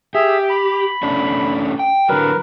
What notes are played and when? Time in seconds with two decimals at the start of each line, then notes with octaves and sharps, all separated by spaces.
0.15 G4 G#4 E5
0.50 B5
1.03 A3 C#4 D4
1.79 G5
2.09 D3 F#3 A#4 B4